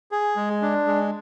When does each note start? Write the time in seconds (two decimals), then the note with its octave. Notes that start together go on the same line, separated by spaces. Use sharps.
0.11 G#4
0.36 G#3
0.62 D4
0.87 G#3